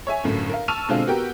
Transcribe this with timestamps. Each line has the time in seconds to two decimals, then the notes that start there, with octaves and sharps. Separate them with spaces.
0.07 C#5 E5 G#5
0.24 G1 F#2 A2
0.49 A#4 F5
0.68 A5 C#6 E6 F6 D#7 F7
0.89 B2 D3 G#3 C4 D4 F4
1.07 B3 F#4 G4 A#4 G5